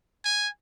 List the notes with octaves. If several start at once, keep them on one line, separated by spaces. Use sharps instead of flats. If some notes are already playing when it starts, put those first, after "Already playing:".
G#5